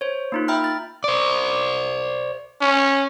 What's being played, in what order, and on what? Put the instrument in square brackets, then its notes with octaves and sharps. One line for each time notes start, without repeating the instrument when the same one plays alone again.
[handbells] C5 C#5
A#3 D#4 F4
E5 G5 A#5 B5 F6
A6
[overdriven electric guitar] C5 D5
[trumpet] C#4